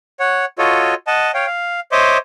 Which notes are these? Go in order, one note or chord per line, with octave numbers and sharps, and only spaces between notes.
C#5 F#5
F4 F#4 A4 C#5 D#5
D#5 F#5 A5
C#5 F5 G5
F5
C5 C#5 D#5 E5 C6 D6